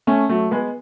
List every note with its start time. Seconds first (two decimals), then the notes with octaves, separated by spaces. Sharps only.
0.07 A3 C#4
0.29 F#3 A3
0.51 G#3 B3